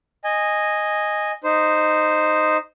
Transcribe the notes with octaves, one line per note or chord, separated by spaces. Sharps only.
D#5 G#5
D#4 C5